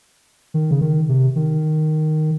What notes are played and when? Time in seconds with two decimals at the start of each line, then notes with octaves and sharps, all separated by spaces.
0.54 D#3
0.71 C#3
0.81 D#3
1.09 C3
1.36 D#3